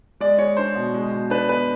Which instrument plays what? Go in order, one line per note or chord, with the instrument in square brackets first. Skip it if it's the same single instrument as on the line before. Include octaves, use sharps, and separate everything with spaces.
[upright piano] G#3 [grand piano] D5
[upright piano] G#3 [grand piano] C#5
[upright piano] D4 [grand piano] C5
[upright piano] B2
G#3
B2
[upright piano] D4 [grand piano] B4
[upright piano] B3 [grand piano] B4